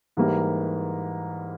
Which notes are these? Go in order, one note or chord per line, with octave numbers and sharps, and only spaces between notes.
G#2 E3 G3 A#3